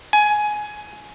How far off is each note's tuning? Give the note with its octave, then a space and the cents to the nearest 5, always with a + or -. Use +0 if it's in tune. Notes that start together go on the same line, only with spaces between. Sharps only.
G#5 +15